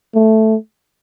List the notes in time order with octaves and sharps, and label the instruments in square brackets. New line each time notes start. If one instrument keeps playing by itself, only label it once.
[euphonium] A3